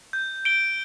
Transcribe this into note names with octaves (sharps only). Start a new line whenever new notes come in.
G6
D7 G7